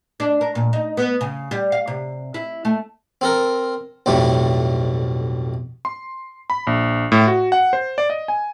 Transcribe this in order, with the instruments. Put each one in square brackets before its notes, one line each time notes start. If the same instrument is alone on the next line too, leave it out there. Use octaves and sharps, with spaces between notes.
[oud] D4
A#4
A#2
D#4
B3
C#3
G3
F5
C3
E4
A3
[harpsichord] C4 A4 A#4
B1 F2 A2 G3 A3
[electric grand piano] C6
B5
A#1
A2
F#4
F#5
C5
D5
D#5
G#5